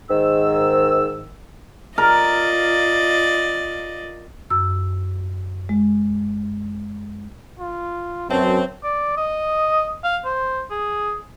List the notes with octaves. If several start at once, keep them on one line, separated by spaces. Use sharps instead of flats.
G#2 D#3 E6
F4 A#4 D5 D#5
F#2 E6
G#3
F4
F#2 C4 B4 C#5 E5 A5
D5
D#5
F5
C5
G#4